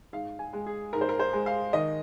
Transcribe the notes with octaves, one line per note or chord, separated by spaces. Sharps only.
G#2 F5
G#5
G#3
G#4
G#2 A#4
C5
A#4
C5
G#3
F5
D#3 D#5